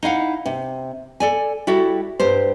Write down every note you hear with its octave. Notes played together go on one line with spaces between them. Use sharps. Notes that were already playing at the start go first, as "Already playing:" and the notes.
D#4 E4 F5 F#5
C3
A4 D5 G#5
G3 E4 F#4 A4
G2 G4 C5